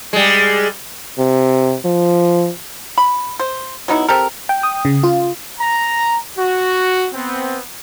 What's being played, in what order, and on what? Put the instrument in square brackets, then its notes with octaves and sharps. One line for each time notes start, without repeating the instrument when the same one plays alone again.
[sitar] G3 G#3
[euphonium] C3
F3
[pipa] B5
C5
F#3 B3 D#4 E4
C4 G4 A4 A#4
[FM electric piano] G5
D#6
C#3
F4
[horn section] A#5
F#4
B3 C4